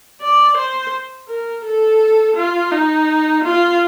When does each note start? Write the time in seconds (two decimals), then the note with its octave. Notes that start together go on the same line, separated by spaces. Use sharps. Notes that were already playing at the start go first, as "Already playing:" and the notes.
0.21 D5
0.57 C5
1.28 A#4
1.64 A4
2.36 F4
2.71 D#4
3.44 F4